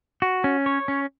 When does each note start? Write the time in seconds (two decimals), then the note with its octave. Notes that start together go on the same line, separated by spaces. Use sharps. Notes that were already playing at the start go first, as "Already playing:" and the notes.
0.22 F#4
0.44 C#4
0.66 C#5
0.88 C#4